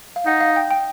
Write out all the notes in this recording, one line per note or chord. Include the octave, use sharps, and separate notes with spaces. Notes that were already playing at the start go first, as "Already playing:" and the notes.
F5
D#4 F#5
F5
G5
G5